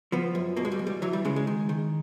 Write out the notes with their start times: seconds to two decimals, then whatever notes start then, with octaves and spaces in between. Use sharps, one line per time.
0.12 F3 B3
0.35 F#2
0.57 B2 A#3
0.65 G#3
0.72 G3
0.79 E2
0.87 G3
1.02 E3 F#3
1.13 G3
1.25 C#3 G#3
1.36 G#3
1.47 D#3
1.69 D#3